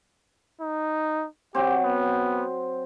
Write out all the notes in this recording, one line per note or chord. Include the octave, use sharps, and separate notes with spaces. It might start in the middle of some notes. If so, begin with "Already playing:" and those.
D#4
F#3 C4 G4
B3